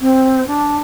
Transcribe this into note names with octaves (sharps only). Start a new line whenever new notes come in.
C4
D4